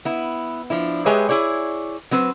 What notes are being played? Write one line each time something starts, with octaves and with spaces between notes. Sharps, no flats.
B3 E4
F3 D4 E4
G#3 G4 G#4 B4 C#5 E5
E4 G#4 C#5 D5
F#3 C4 B4